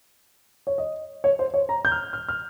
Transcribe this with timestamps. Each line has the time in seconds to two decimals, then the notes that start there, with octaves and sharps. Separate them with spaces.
0.67 C#5
0.78 D#5
1.24 C#5
1.39 C5
1.54 C#5
1.69 A#5
1.85 G6
1.92 F6
2.13 F6
2.28 F6